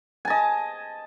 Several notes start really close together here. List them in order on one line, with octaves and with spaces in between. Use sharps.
G#5 A5 D#5